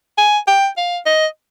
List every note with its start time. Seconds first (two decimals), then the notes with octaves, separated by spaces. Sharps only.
0.18 G#5
0.48 G5
0.77 F5
1.06 D#5